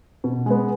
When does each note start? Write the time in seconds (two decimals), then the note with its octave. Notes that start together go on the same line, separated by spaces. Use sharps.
0.24 B2
0.46 G#3 B3